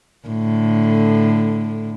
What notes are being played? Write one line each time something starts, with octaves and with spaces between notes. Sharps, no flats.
A2 D3